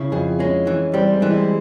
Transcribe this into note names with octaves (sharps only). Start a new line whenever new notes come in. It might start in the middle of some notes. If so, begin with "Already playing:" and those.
Already playing: C#3 E4
F2 G#4
G#3 C#4
E3
G3 C4
G#3
E3
G#3